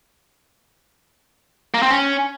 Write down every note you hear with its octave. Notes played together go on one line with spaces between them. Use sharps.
A#3
C4
C#4